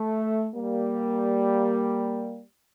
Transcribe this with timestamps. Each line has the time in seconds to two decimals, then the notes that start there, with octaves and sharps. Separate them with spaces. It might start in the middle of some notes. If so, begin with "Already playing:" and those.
Already playing: A3
0.55 G3 A#3